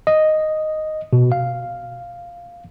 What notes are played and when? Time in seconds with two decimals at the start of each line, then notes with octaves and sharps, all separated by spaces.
0.07 D#5
1.13 B2
1.32 F5